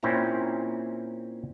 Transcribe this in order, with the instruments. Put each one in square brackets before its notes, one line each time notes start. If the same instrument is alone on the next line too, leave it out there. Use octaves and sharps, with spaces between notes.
[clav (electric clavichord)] A#2 C4 C#4 E4 A#5